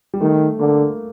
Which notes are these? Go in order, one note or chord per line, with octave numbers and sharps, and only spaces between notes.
G3
D#3 A3
D3 A#3